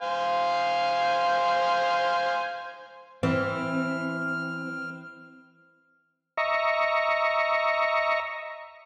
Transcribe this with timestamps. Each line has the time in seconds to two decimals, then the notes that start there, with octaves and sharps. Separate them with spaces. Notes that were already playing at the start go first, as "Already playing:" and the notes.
0.02 C5 F5 G#5
3.23 E3 C4 F6
6.37 D#5 E5 A#5 C#6